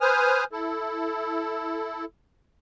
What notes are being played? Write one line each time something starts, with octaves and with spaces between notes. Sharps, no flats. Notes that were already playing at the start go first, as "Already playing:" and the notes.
B4 C5 G#5 D#6 F6
E4 A4